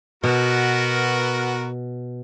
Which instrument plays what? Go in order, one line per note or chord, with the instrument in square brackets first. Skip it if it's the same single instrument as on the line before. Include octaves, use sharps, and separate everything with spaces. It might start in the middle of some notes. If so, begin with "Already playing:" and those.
[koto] B2 [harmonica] B3 F#4 A#4